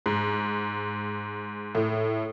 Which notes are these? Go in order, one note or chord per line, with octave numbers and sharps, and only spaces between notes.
G#2
A2